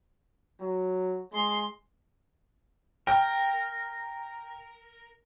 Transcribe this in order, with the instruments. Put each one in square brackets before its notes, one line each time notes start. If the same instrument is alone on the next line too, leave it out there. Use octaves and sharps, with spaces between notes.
[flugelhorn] F#3
[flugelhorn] G#3 [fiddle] C6
[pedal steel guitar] A#4 [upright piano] G5